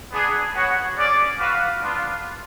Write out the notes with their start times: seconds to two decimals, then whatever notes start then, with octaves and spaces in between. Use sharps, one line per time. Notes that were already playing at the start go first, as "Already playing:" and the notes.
0.12 B3 D4 G#4
0.55 B3 F#4 C#5 F#5
0.97 C#4 G#4 D5
1.39 F#4 B4 F5
1.81 B3 D4 F4 B4